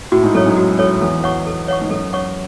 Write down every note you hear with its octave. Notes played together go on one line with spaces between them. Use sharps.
A2 F#4
G#2
F#2 A4 C#5
G#2
F#4
A4 C#5
E2 A4
C#5 F#5 C#6
A4
C#5 F#5 C#6
G#2
F#2 A4
C#5 F#5 C#6